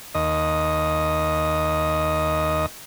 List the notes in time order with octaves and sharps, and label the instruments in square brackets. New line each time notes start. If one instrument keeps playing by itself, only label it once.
[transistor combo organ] D#2 D#5